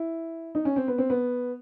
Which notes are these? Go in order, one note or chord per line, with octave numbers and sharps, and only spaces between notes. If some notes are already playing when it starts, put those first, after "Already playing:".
Already playing: E4
D#4
C#4
C4
B3
C4
B3